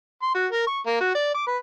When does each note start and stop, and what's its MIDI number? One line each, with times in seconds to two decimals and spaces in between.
0.22 0.33 84
0.35 0.46 66
0.51 0.65 70
0.67 0.80 85
0.86 0.97 58
1.00 1.12 66
1.15 1.30 74
1.34 1.46 86
1.47 1.57 71